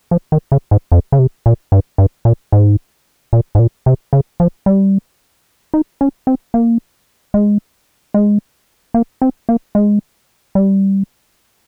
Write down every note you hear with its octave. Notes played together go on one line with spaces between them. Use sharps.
F3
D#3
C#3
G#2
F2
C#3
C3
A#2
G2
G2
A#2
G#2
A#2
G#2
A#2
C3
C#3
F3
G3
D#4
C#4
C4
A#3
G#3
G#3
A#3
C4
A#3
G#3
G3